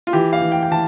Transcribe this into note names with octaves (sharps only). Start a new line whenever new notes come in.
F4
E3 G4
F5
E3
G5
G5
E3 A5